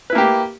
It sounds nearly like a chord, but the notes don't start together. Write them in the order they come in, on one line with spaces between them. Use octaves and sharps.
B4 E4 A#3 G4